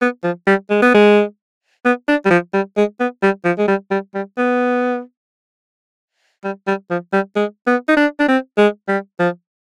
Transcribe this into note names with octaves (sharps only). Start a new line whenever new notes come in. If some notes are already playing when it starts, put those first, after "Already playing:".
B3
F3
G3
G#3
B3
G#3
B3
D4
G3
F3
G3
G#3
B3
G3
F3
G#3
G3
G3
G3
B3
G3
G3
F3
G3
G#3
B3
D#4
D4
D4
C4
G#3
G3
F3